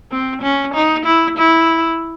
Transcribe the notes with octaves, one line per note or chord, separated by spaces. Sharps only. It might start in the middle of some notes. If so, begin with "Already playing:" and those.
C4
C#4
D#4
E4
E4